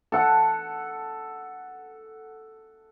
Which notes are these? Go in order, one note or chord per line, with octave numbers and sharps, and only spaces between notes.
A4 F#5